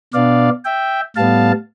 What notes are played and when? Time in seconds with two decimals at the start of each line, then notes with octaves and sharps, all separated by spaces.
0.14 B2 B3 D4 D5 F5
0.65 E5 G5
1.16 A2 G3 B3 F5 A5